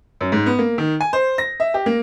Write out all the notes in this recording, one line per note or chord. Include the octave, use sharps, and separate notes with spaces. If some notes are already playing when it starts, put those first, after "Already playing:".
F#2
G#2
B3
A#3
D#3
G#5
C5
A#6
E5
G4
A#3